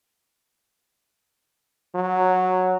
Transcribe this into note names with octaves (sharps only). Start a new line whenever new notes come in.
F#3